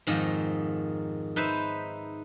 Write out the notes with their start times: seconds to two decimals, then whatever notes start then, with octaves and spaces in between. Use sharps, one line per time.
0.07 F2 G#2 D#3
1.36 D#4 B4 C5 E5